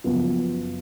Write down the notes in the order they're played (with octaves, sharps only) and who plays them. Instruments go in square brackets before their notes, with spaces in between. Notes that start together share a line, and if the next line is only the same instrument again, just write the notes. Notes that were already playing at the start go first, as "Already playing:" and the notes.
[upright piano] F#1 F#2 F3 B3 F4